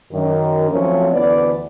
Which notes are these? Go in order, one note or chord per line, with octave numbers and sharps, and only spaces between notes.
F#2 D#3
F3 F#3 A3 C4 C#4 F#4
D2 E3 B3 B4 D5